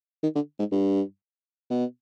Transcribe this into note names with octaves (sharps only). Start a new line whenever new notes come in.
D#3
D3
G#2
G2
B2